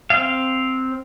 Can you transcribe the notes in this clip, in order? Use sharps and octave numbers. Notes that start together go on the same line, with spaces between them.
C4 F5